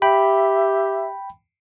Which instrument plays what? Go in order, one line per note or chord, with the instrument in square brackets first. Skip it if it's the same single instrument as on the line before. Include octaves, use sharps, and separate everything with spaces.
[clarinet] G4 [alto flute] E5 [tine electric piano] G5 B5